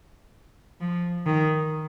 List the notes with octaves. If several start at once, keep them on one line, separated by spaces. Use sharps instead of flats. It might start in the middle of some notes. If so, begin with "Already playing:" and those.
F3
D#3